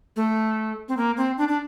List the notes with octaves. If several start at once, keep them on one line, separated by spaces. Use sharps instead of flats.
A3
C4
A#3
C4
D4
D4